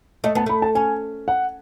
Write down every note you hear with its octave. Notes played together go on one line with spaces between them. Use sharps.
A3 D#5
B3 A5
A3 B5
A5
C#4 G#5
F#5